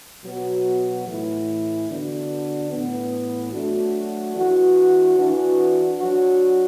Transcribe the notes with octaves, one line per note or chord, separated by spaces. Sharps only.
B2 F#3 B3 F#4
A2 E3 A3 E4
D3 B3 D4 F#4
A2 E3 B3
F#3 A3 D4 F#4
E3 D4 F#4
E3 D4 F#4
F#3 D4 F#4